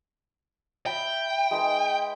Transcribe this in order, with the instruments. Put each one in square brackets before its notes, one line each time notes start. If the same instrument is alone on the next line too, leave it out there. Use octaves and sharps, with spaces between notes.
[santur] E5 B5 D#6 [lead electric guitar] G5
[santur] G#3 D#4 B4